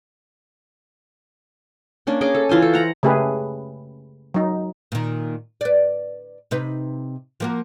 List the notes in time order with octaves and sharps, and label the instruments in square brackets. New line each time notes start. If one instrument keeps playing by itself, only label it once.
[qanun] A#3 C#4 D4
C#4 G#4 D#5 D6
A4
E3 F4 C5 G#5
A4
F#5 A#5
[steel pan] C#3 A3 G4 G#4 B4
F#3 D#4
[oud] A#2 D#3
B4 D5
C3 D#4 B4
F3 A#3 F#4